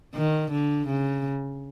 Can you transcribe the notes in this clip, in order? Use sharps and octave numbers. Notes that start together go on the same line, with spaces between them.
D#3
D3
C#3